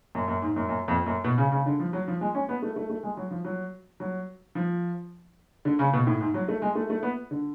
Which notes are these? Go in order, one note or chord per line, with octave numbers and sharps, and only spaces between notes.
F#2
F#2
G#2
F#2
F#2
F2
F#2
B2
C#3
C#3
D3
F3
F#3
F3
G#3
C#4
B3
A3
A3
A3
G#3
F#3
F3
F#3
F#3
F3
D3
C#3
B2
A2
G#2
F#3
A3
G#3
A3
A3
B3
D3